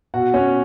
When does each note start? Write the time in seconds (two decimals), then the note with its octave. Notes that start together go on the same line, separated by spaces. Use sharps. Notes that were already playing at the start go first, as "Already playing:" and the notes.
0.14 B2 F#4 F#5
0.34 C#4 C#5